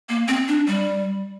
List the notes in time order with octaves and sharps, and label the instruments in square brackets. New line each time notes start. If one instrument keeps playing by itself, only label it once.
[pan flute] A#3
C4
D4
G3